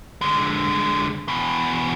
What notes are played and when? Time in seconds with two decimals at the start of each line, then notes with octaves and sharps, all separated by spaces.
0.22 D3 G#3
1.28 E2 B2